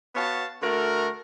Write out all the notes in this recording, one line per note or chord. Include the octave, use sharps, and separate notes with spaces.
B3 F#4 C#5 F5 A5
D3 A3 F#4 A#4